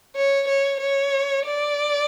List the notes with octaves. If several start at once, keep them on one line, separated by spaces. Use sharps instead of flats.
C#5
C#5
C#5
D5